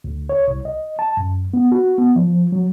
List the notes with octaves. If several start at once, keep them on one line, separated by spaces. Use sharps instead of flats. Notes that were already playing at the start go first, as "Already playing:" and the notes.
D2
C#5
C2
D#5
A5
F#2
B3
F#4
B3
F3
F#3